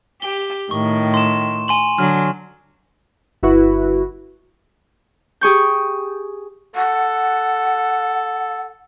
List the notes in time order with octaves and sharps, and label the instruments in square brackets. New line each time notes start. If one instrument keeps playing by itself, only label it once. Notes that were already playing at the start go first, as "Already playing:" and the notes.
[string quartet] G4 [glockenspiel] G7
[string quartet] A2 D#3 [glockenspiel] C#6
[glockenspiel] C6 E7
G#5 C6 F#7
[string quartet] D3 F#3 [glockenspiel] F6
[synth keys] G1 E4 F#4 B4
[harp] G4 G#4 C#6 G6
[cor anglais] A4 [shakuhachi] F#5